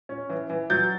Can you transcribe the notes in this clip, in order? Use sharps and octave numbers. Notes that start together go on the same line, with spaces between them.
C#4
E3
E3
F#3 G6 A6